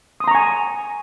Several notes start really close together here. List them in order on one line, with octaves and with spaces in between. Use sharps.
D#6 C6 A#5 C#6 G#5